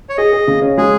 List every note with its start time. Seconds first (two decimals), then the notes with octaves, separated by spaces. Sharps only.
0.09 C#5
0.17 G#4 D#5
0.33 G#4
0.47 C#3
0.62 C#4
0.77 G#3 G#4